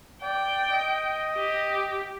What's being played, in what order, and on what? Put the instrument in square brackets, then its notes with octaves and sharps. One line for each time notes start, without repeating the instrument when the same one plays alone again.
[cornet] D5 [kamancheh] G5
[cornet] D#5
[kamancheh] G4